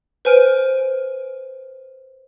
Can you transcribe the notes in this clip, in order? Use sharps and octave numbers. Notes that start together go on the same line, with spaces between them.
B4 C5 G#5 F6 D7 D#7